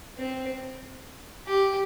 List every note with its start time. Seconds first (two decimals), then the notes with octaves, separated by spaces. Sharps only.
0.17 C4
1.47 G4